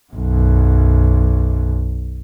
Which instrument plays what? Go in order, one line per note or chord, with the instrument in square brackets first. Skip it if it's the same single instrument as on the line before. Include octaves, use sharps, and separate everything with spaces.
[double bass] B1 F#2